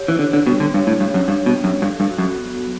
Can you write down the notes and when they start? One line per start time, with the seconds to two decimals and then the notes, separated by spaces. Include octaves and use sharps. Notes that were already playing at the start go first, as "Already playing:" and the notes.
Already playing: G4 C#5
0.08 E3
0.19 D3 D4
0.33 D3
0.46 B2 G3
0.60 D3
0.74 G2 C#5
0.87 A2
1.00 G2 G4
1.14 F#2
1.28 G2 D4
1.46 B2
1.54 G3
1.64 F#2
1.81 G2 A4
2.00 G2
2.08 F#4
2.18 F#2
2.35 B3
2.62 F#3